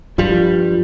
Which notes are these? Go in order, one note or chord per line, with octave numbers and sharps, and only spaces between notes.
G2 F3 G3